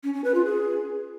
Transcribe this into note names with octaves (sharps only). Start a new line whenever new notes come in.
C#4
C#4
B4
F4
G#4